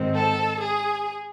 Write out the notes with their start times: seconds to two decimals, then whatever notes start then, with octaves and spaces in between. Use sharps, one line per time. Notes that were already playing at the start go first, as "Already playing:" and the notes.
Already playing: G#2 D#3 G#3 C4
0.16 A4 A5
0.61 G#4 G#5